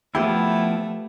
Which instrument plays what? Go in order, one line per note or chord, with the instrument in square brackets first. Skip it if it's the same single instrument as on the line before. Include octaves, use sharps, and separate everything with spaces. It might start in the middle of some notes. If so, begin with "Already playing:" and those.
[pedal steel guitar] F3 B3 E4 [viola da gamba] A3 [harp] G4